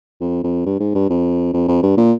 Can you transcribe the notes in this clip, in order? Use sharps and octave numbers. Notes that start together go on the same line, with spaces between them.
F2
F2
G2
G#2
G2
F2
F2
F2
G2
A#2